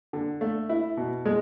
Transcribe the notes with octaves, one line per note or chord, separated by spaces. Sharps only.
D3
A3
E4
B2
G#3